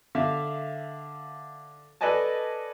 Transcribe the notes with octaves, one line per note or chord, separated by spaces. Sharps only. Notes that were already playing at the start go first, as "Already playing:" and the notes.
D3 E5 F5
A4 B4 D5 D#5 G#5 A5